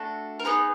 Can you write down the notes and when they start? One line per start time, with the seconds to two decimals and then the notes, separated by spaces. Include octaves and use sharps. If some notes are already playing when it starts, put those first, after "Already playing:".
Already playing: A3 D4 F#4 A4
0.39 A#4
0.45 B3 D#4 G#4 B4